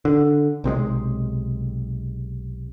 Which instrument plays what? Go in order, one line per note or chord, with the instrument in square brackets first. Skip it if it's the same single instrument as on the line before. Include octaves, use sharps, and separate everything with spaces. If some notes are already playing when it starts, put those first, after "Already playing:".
[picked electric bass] D3
B1 C3 F#3 G#3